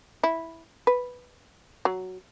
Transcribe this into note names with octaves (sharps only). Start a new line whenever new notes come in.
E4
B4
F#3